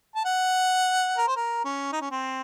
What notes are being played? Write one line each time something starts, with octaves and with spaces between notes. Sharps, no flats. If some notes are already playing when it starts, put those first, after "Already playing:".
A5
F#5
A#4
C5
A#4
C#4
D#4
C#4
C4